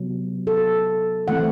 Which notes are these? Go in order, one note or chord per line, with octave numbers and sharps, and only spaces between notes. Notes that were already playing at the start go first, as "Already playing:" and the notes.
Already playing: C3 F#3 B3
A4
E3 A3 C4 F#5